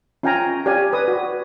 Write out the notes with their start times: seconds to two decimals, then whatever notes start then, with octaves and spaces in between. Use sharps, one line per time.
0.23 C#4 F4 F5 G5 G#5 A#5
0.66 G4 C#5 D5 F5 G#5
0.93 B4 D#6
1.08 F#4